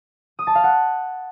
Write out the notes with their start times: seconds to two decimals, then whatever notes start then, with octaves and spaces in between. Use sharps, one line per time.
0.39 D#6
0.47 A5
0.55 F5
0.64 F#5